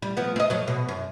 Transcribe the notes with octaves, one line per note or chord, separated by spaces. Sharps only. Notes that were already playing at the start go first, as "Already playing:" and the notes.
G3
F3 B3
C4 D#5
F2 F#3
B2
F#2